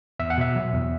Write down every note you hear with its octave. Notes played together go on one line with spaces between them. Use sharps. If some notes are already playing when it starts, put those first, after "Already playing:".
E2 E5
F#5
B2 E5
F#3
E2